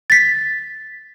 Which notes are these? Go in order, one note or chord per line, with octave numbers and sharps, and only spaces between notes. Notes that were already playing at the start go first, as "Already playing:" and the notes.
A6 B6